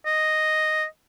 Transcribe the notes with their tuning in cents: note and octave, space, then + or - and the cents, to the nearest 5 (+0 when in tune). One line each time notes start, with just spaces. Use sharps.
D#5 -5